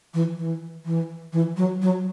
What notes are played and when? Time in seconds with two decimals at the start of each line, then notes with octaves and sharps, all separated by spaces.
0.14 E3
0.38 E3
0.85 E3
1.33 E3
1.57 F#3
1.82 F#3